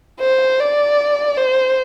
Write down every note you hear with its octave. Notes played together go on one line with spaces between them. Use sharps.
C5
D5
C5